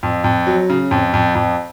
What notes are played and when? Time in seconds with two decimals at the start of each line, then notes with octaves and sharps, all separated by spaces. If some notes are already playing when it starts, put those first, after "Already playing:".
0.03 F2
0.24 F2
0.47 F#3
0.70 C#3
0.91 F2
1.14 F2
1.35 F2